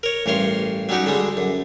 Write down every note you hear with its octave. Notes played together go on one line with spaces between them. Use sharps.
A#4 C#5
A1 G2 A#4 C#5 C6
F#3 G3 C#4 D#4 F#4 G4
D3 G3 G#3
F#2